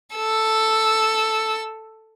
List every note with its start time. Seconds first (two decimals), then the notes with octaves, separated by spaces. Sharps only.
0.15 A4 E6